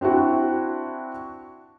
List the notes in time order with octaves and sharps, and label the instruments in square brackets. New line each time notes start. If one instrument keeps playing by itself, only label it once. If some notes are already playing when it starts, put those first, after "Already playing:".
[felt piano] C4 D4 E4 F#4